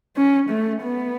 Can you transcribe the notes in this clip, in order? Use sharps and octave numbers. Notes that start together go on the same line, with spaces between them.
C#4
A3
B3